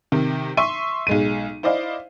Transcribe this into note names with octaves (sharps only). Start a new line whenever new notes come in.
C3 D#3
E5 C6 C#6 D#7
B1 G#3 D#7
E4 C5 D5 D#5 F5